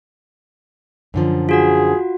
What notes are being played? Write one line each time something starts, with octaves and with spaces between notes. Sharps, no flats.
F#2 D3 F3
F4 F#4 G#4 F#5